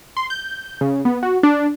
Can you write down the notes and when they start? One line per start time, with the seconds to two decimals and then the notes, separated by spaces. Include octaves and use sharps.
0.17 C6
0.30 G6
0.81 C#3
1.05 B3
1.23 F#4
1.43 D4